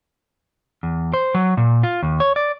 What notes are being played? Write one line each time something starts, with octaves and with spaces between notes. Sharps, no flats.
E2
C5
F#3
A#2
F4
D#2
C#5
D5